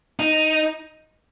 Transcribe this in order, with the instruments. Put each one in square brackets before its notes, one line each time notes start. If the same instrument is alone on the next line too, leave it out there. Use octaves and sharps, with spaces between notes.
[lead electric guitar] D#4